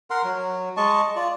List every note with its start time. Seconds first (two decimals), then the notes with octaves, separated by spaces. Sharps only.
0.10 A#4 F#5 C6
0.24 F#3
0.77 G#3 D#5 A5 C#6
1.16 F4 D5